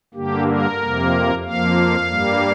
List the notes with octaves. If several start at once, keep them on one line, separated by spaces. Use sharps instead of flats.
G2 D3 A#3 G4
A#4
F2 C3 A#3
F2 F3 A#3 F5
G2 G3 A#3